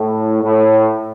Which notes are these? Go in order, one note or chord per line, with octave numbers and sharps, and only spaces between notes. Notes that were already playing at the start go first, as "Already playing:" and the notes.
Already playing: A2
A2